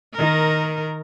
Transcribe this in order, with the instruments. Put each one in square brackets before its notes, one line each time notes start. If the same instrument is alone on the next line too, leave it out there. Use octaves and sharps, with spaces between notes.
[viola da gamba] D#3 A#4